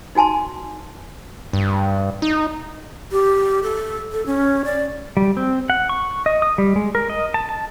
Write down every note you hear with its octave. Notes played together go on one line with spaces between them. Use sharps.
D#4 F#4 G#5 A5 C6
G2
D#4
G4
A4
A4
C#4
D5
G3
C4
F#5
C#6
D#5
D#6
G3
G#3
A#4
D#5
A5
A5